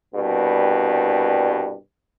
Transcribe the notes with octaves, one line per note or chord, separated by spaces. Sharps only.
C2 G2 B2